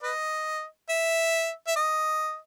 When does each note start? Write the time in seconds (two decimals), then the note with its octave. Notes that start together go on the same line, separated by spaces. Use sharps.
0.03 B4 D#5
0.89 E5
1.67 E5
1.76 D#5